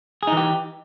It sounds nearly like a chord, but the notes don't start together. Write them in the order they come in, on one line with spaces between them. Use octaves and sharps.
G#4 D#4 E3 G4